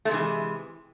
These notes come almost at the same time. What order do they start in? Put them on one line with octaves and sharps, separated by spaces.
A3 C3 G#3 E3